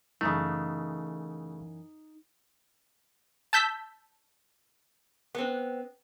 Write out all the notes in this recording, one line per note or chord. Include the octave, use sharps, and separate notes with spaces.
F#2 C#3 E3 A3 D#4 E5
A5 E6 G6 B6
B3 C4